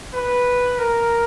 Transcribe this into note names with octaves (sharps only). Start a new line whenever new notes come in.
B4
A#4